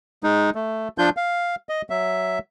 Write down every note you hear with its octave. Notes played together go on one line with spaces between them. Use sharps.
G#3 D#4
A3
F3 D4 F4 G6
F5
D#5
F#3 E5